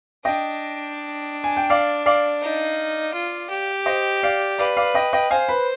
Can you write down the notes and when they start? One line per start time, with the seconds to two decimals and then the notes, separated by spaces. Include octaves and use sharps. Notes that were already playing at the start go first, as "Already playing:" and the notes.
0.25 D4 D#5 G5
1.44 G#5
1.57 G5
1.70 D5 F5
2.06 D5 F5
2.42 D#4
3.14 F4
3.50 G4
3.86 C5 D#5
4.23 D5 F5
4.58 B4 D5 F5
4.77 D5 F5
4.94 D#5 G5
5.13 D#5 G5
5.31 C5 F5 G#5
5.49 B4